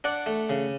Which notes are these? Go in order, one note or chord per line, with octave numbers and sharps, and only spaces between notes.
D4 D5 F#5
A3
C#3